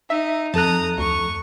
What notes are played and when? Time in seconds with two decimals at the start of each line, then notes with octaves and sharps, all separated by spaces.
0.10 D#4 E5
0.54 F2 A4 A5 A#5 D#6 F#6
0.98 D2 C#6